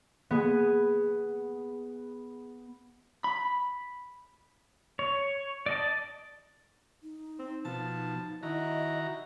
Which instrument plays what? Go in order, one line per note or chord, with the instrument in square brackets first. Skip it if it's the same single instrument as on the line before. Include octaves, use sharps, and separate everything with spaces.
[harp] B3 G#4
[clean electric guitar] B5
[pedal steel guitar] C#5
D5 D#5 A5
[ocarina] D#4
[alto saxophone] C4
[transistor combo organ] B2 F3 [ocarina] D#4 [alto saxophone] A5
[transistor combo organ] D#3 F#4 A#5 [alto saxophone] E4 [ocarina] D#5